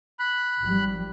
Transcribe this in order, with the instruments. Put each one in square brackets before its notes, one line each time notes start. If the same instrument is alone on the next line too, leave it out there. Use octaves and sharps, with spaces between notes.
[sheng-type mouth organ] B5 F#6
[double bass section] G#1 F3 G3